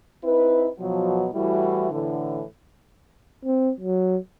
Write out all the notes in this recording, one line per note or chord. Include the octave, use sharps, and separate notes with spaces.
C4 D#4 E4 B4
B2 F3 F#3
A2 E3 G3 E4 F#4
A2 D3 E3
C4
F#3